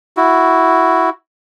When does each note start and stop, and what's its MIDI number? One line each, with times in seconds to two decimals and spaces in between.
0.17 1.10 64
0.17 1.10 66